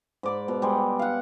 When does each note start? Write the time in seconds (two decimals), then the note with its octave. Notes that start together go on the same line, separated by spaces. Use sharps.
0.23 G#2 D5 B5
0.48 B2
0.62 G3 G#3
0.99 F5 F#5